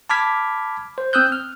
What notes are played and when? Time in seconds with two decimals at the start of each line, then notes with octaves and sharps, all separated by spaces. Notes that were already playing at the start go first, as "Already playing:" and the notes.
0.10 A5 B5 D6 F6 G#6 B6
0.98 C5
1.13 C4 D#6 E6 F#6 G6
1.32 F6